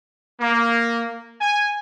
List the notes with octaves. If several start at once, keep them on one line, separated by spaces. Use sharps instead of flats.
A#3
G#5